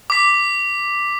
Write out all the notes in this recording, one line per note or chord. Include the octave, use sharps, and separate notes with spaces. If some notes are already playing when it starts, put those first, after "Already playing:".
D6 B6